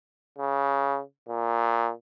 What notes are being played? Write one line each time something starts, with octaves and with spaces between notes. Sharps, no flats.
C#3
A#2